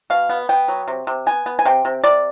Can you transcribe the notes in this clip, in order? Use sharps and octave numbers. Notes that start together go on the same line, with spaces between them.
B2 F5
B3
B3 G5
F#3
C3
C3
B3 G#5
B3
G#5
C3 G5
C3
C3 D5